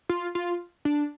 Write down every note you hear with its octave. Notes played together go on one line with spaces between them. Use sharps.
F4
F4
D4